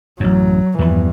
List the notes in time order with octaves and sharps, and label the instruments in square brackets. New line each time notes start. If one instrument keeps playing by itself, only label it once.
[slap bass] A1 F#2 [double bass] F#3
[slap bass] E2 F3 B3 [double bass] G2 E3